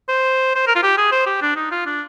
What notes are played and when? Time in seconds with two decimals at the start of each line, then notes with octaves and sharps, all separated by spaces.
0.08 C5
0.55 C5
0.67 A#4
0.75 F4
0.83 G4
0.98 G#4
1.12 C5
1.26 G4
1.42 D4
1.56 D#4
1.71 F4
1.86 D4